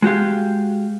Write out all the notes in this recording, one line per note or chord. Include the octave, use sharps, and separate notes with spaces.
G#3 F#4 G4 F5